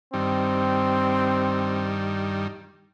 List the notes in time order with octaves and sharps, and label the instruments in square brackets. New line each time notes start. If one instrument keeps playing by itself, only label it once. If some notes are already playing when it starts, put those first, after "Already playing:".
[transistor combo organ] G2 D#3 G3 [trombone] C4